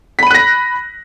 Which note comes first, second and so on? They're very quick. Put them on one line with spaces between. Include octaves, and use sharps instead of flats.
B6 B5 D#7 F#6 A#6